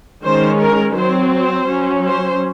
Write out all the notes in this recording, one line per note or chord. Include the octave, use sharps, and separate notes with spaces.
D#3 G#3 C#4 C5
A#4
F#3 C4 C5
C5
F#3 C#4
C5